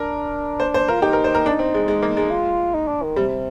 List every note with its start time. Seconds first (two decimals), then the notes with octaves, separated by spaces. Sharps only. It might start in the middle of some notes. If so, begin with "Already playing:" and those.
Already playing: D4 A#4
0.60 C5
0.74 C5
0.88 F4 A#4
1.02 D#4 G4
1.13 A#4
1.24 C5
1.35 A#4
1.46 D4
1.59 C4
1.74 G#3
1.88 G#3
2.02 A#3
2.17 G#3
2.31 F4
2.74 D#4
2.88 D4
3.03 D#3
3.16 C3 G3